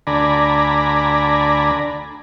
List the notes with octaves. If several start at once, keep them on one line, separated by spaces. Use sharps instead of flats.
D2 D3 D5 G#5 A#5 B5